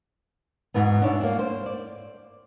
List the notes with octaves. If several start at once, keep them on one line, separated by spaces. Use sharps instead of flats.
E2 G#2 B2 B3
D4 E4 C#5 E5
G3 A#3
C5
D5